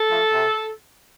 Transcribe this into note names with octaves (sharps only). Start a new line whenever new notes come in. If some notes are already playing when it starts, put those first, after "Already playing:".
Already playing: A4
F3 A3
C3